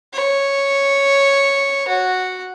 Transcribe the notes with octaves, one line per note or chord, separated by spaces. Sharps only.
C#5
F#4